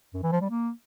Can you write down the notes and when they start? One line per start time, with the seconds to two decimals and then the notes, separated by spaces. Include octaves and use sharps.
0.14 F#2
0.23 E3
0.32 F3
0.41 G3
0.50 A#3